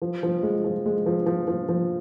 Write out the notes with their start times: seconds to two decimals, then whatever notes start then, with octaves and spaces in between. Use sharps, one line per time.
0.02 F3
0.23 F3
0.43 G#3
0.64 F3
0.86 G#3
1.06 F3
1.26 F3
1.48 F3
1.69 F3